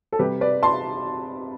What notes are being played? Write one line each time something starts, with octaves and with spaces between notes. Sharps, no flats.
A4
C3 G3 G4 B4
B4 D5
A5 C6